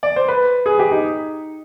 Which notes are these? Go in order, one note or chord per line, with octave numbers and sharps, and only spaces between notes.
D5
C5
B4
G#4
G4
D#4